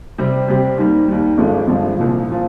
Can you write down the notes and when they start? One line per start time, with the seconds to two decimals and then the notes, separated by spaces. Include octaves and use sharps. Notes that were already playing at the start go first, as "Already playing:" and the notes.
0.18 C3 G3 C4 G4
0.48 C3 G3 C4 G4
0.78 D#2 D#3 G3
1.08 D#2 D#3 G3
1.38 G1 G2 F3 G#3
1.67 G1 G2 F3 G#3
1.97 C2 A#2 F3
2.30 A#2 F3